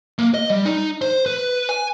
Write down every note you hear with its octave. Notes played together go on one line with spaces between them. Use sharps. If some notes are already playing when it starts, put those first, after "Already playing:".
A#3
D#5
G3
D#4
C5
B4
G#5